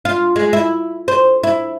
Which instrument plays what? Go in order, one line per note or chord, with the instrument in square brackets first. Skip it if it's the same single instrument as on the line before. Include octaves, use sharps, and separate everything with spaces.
[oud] F4
G#3
E4
C5
E4